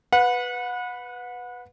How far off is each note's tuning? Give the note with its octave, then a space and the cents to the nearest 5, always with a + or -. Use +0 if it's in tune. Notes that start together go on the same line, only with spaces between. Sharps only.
B4 +0 F#5 -30